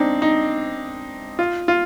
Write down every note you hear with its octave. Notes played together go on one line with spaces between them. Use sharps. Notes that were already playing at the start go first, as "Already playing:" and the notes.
Already playing: C4 D4 D#4
D#4
F4
F4